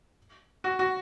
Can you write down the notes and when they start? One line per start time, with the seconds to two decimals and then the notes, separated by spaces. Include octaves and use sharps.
0.64 F#4
0.79 F#4